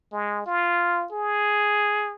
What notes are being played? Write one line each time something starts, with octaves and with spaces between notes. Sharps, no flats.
G#3
F4
G#4